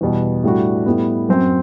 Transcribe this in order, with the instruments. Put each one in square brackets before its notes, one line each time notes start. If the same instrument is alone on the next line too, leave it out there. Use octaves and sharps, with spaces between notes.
[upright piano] E2 B2 G3
A2 G3 D4 F#4
A2 G3 B3
F#2 F#3 C4